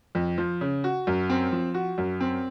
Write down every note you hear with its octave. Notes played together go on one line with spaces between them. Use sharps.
F2
F3
C#3
F#4
F#2
C4
F3
F#4
F#2
C4